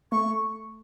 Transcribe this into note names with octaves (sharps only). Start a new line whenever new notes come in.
A3 C#6